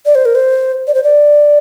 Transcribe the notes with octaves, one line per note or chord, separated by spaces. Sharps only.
D5
C5
A#4
C5
D5
C5
D5